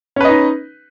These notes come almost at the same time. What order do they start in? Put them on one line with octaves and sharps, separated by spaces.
C#4 B4 D#5 D#4